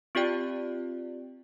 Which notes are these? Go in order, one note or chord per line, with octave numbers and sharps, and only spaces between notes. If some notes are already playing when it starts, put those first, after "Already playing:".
C4 F4 G4 D5 G5